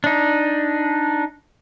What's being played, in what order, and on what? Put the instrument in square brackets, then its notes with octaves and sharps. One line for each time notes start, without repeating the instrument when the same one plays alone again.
[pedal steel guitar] D4 D#4